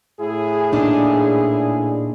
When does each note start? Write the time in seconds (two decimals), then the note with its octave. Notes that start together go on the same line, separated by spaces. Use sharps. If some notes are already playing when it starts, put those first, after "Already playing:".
0.19 A2 E4 G#4
0.72 A#2 D4 D#4